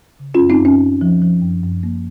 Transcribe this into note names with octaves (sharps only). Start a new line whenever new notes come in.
C#3
F#2 C#4 F4
C4 D#4
F#2 C#4
F#2
F3
F3
F#2
F#2
A#3